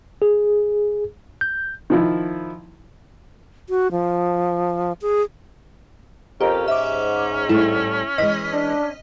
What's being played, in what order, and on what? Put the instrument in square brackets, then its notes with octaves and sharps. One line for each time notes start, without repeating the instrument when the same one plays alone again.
[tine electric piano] G#4
G6
[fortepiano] D#3 F3 E4
[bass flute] F#4
F3
G#4
[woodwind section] F2 A#4 [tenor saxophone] C#4 [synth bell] G4
[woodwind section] G#2 [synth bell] E5 D6
[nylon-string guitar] A2 G3 A3 [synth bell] E4
[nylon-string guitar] E3 G#3 [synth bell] D#5 F6 B6
[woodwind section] D4